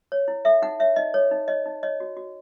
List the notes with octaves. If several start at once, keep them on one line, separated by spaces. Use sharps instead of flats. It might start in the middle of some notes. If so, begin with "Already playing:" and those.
C#5
E4
A4 E5
D#4 F#5
C#5 E5
D#4 D#5
A4 C#5
D#4
C#5 D#5
D#4
C#5 D#5
F#4
F#4